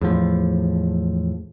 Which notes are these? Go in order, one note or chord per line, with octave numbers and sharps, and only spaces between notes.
E2 A2 F3